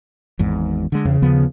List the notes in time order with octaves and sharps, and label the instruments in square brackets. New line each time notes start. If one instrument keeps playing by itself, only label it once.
[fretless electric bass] G#1 E2 G#2
D3 G#3
[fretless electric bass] E2 [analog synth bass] C#3
[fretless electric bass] D#2 F3 B3